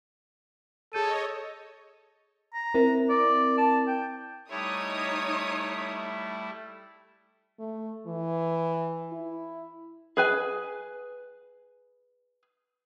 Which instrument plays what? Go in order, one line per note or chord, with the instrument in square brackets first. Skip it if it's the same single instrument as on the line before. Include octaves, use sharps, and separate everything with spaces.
[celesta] G#4 G6 D#7 [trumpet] A4 [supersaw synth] C#5 D#5
[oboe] A#5
[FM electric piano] C4 E4 A#4
[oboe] D5
A5
G5
[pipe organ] G3 A3 E4 [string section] D#4 D#6 [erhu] C#5
[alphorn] A3
E3
E4
[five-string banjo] G#4 B4 G#5